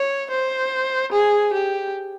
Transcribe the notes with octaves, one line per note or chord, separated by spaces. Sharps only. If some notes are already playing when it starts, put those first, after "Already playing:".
Already playing: C#5
C5
G#4
G4